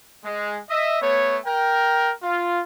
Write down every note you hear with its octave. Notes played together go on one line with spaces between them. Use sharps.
G#3
D#5 E5
A3 B3 C#5
A#4 G5
F4